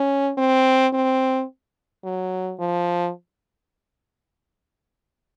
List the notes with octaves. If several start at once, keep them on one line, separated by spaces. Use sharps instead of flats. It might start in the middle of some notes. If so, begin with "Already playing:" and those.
Already playing: C#4
C4
C4
F#3
F3